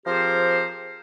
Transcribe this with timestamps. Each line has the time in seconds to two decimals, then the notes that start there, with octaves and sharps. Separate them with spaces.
0.06 F3 C4 G4 G#4 A#4 C5